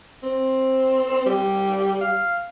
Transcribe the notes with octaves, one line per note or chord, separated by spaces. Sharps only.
C4
G3
F5